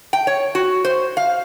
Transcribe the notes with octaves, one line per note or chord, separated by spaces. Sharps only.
G5
C#5
F#4
C5
F5